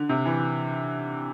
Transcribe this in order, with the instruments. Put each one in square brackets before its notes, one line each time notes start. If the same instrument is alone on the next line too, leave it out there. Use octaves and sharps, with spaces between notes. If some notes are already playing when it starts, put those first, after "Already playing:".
Already playing: [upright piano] D3
C3
E3